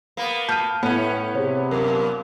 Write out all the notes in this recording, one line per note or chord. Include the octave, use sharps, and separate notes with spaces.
A#3 B3
A5 F6 G6 D#7
A2 B3 C#4 B4
C3 G#4 C5 C#5
F#2 A#2 A#4